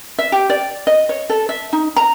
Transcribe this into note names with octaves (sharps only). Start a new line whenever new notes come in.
E5
G4
D5
D#5
C#5
A4
E5
D#4
A#5